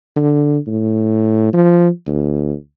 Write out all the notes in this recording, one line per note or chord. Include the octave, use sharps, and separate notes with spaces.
D3
A2
F3
D2